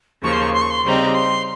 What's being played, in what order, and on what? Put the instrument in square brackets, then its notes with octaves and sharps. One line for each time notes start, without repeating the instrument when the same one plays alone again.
[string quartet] D#2 C#3 F3 A#3 [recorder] C#6
[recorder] C6
C#6
C6
C#6
C6
[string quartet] C#3 G3 C4 D#4 [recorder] A#5 C6
[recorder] C6